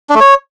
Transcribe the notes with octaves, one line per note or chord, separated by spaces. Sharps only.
D4
A3
C#5